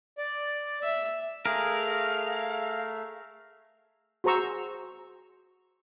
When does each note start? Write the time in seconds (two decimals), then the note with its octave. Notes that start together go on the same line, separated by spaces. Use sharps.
0.18 D5
0.83 E5
1.46 A3 G#4 A#4 E5 F5
4.24 F#4 G#4 C5 A#5 C#6 E6